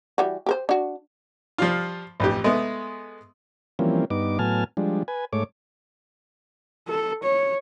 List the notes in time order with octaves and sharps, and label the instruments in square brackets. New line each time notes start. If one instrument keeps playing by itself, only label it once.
[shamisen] E3 G3 F#4
G4 A#4 C5
D4 F#4
[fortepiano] F3 G3 F4
A1 F2 G4
G#3 A3 B3
[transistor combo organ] E3 F3 G3 A#3 C4 C#4
G2 B3 D#4 D6
A2 F#3 B3 G#5 A5 F6
F3 G3 G#3 D4
B4 G#5
G#2 A3 C#5 D6
[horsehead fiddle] A4
C#5